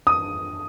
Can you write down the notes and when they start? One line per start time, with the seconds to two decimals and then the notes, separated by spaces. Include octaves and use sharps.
0.07 D#6